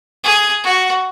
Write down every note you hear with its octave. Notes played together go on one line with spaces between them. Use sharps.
G#4
F#4